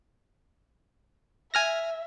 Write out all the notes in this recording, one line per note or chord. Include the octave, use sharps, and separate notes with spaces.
E5 G#5 F6 A#6